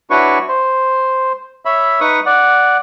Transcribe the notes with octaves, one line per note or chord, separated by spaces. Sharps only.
D4 E4 F#4 B4 C#5 C#6
C5
C#5 E5 B5
D#4 B4 C#6 D#6
D5 F#5